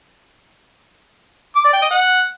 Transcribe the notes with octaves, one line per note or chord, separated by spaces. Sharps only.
D6
D5
G5
D#5
F#5